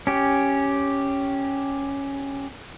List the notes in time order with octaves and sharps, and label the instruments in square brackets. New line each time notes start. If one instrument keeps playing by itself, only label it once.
[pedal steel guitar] C#4 G4